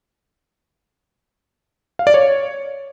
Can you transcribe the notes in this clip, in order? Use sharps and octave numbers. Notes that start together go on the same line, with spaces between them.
F5
D5
C#5